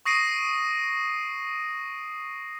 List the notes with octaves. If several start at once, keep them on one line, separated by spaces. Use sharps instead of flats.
C#6 D#6 A#6 C7 D7 D#7